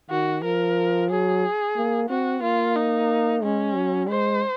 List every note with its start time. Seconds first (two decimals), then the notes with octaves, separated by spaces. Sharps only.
0.11 D#3 F#4
0.43 F3 A#4
1.10 F#3 G#4
1.77 A#3
2.09 C4 F#4
2.42 A#3 F4
2.76 D#4
3.43 G#3 C#4
3.75 F#3
4.09 G#3 C5